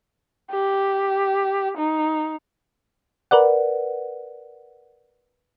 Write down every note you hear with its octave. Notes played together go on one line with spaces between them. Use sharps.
G4
D#4
A#4 B4 D5 F#5